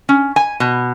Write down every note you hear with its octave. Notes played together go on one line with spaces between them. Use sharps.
C#4
G#5
B2